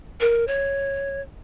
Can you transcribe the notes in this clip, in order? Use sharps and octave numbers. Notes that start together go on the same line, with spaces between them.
A#4
C#5